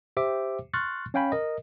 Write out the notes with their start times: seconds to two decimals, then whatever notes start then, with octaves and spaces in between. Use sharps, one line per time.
0.17 G4 C5 E5 G5 D6
0.73 C6 C#6 F6 F#6 A6
1.14 C#4 C#5 F5 G5 G#5 B5
1.32 A#4 D#5